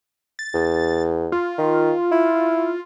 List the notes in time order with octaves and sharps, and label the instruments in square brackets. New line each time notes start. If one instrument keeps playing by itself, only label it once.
[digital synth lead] A6
[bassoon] E2
[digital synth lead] F4
[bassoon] D#3
E4